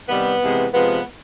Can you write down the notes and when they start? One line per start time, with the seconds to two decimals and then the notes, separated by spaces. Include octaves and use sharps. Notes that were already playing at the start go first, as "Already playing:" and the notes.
0.09 C3 D#3 G3 B3
0.41 C3 E3 G#3
0.73 C3 F3 G#3 B3